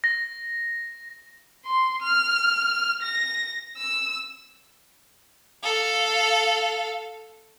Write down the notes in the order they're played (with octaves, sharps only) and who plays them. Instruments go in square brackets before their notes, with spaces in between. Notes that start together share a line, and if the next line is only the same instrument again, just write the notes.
[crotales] A#6
[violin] C6
F6
A#6
E6
A4 F5